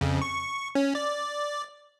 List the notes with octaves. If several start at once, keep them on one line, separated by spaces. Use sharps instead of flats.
F2 C#3
C#6
C#4
D5